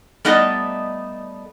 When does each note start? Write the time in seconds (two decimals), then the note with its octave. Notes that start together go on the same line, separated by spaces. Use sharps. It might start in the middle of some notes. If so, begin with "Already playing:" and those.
0.25 G3 A3 B3 D#4 D5 D#5